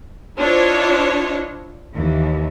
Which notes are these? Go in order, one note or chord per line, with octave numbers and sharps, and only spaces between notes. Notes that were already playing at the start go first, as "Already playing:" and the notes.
D4 E4 F4 C5 C#5 D#5
D#2 E3